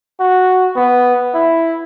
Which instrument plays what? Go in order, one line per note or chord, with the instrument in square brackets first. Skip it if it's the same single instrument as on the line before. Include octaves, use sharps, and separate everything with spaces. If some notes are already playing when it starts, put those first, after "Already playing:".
[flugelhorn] F#4
B3
E4